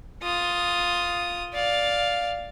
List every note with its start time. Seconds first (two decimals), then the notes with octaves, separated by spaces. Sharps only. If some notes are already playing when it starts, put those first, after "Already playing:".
0.23 F4 D#6
1.54 D5 F5